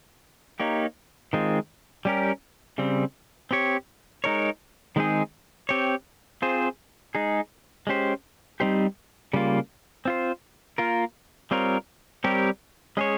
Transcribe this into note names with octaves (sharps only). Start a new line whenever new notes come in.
A#3 D#4 G4 C#5
D#3 G#3 C4 F4
G3 C#4 G4 A#4
C#3 G3 C4
C4 G4 C#5
G#3 D#4 A#4 C#5
D#3 G#3 C4 D#4 G#4
C4 G4 C#5
C4 F4 G#4 C5
G#3 D#4 G#4
G#3 C#4 G4 C5
G3 C4 D#4 G4 C5
C#3 G3 A#3 F4
C4 F4 C5
A#3 F4 A#4
G3 C4 F4 A#4 C#5
G3 C4 G4 A#4 C#5
G#3 C#4 G#4 C#5